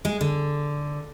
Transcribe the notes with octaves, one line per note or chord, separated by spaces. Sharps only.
G#3
D3